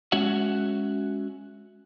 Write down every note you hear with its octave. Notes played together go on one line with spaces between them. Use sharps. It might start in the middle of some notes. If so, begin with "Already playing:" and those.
G#3 C#4 F#4 C#5 E5 F#5